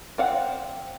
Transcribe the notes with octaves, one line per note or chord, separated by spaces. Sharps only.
C4 F5 F#5